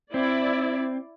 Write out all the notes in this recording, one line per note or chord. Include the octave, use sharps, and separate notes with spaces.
C4 E4 D5